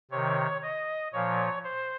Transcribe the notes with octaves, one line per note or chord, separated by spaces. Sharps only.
C3 D#3 C#5
D#5
A#2 F3 C#5
C5